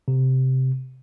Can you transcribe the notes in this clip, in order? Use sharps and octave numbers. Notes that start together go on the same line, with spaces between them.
C3